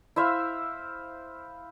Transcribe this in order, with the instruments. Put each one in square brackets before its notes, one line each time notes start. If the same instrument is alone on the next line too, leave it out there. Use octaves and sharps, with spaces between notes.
[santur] E4 C5 E5 F5